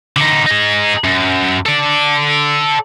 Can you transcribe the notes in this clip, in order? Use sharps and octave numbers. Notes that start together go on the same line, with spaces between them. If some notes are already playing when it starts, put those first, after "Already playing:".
D3 D#4
D#4 G#4
F#2
A4 D5